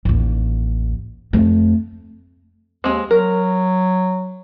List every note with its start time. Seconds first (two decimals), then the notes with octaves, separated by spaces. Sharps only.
0.05 A1 D#2
1.33 F2 A3
2.84 D#2 G#3 C4
3.11 F#3 A#4